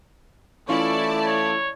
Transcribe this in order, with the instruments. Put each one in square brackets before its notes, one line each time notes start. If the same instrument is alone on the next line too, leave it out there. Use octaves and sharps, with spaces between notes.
[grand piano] E3 C#4 F4 [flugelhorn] A3 [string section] E4 D5 A5 [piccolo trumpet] C#6
[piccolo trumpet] C#5